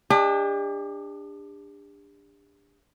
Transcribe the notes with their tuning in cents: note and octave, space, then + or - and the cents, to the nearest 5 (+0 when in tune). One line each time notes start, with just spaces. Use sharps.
D4 +0 G4 +45 D#5 +0